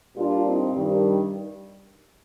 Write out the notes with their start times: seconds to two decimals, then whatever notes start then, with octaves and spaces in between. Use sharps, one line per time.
0.17 A#2 G3 D4 F4
0.45 C4 D#4
0.73 G2 D#3 G3